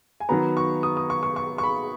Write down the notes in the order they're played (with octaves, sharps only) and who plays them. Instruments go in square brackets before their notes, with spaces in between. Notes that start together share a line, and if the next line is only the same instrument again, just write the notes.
[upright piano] G#5
D#3 F#3 B3 A#5
C#6
D#6
D#6
C#6
C#6
C#6
C#6
B5